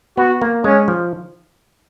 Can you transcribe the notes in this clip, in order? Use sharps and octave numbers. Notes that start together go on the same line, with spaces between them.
B3 F#4
A#3
G#3 C#4
F3